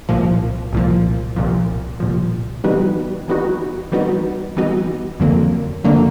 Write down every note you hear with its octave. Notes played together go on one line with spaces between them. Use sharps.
C2 A#2 F3
C2 A#2 F3
C2 A#2 F3
C2 A#2 F3
E3 G3 B3 D#4 F#4
E3 G3 B3 D#4 F#4
E3 G3 B3 D#4 F#4
E3 G3 B3 D#4 F#4
F2 D3 F#3 A#3
F2 D3 F#3 A#3